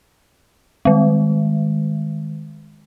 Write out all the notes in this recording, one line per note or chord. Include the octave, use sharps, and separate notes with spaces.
D#3 G#3